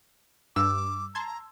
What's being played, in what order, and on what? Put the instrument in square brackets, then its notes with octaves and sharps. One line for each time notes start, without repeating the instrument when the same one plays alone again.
[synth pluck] G2 [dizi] D6 [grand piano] E6
[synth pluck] A5 C6 G#6 [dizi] A#5